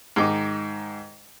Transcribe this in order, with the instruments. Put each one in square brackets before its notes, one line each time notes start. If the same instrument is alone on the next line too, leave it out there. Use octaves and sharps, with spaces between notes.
[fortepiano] G#2 D#3 D#4 D6